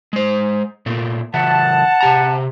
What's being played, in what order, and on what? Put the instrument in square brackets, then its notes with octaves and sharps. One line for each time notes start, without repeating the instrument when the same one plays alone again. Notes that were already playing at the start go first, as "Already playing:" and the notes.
[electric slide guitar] G#3 C5
A#2 A3 A#3
[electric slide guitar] C#3 E3 E5 [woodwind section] F#5 A5
[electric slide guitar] C3 G4 A#5